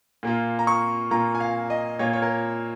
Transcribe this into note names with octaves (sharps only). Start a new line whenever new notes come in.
A#2 A#3 F4
A#5
C#6
A#2 A#3 F4 A#5
G#5
F5
D#5
A#2 A#3 F4 C#5
C#5
A#4